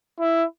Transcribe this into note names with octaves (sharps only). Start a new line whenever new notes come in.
E4